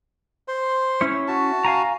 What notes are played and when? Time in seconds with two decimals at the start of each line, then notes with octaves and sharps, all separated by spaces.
0.48 C5 C6
1.01 C#4 E4 C#5
1.28 F#4 A5
1.65 F5 G#5 A#5